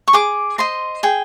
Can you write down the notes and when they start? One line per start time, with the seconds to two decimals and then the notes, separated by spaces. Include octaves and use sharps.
0.08 C#6
0.13 G#4 D6
0.58 C5 D#5 C6
1.03 G#4 G5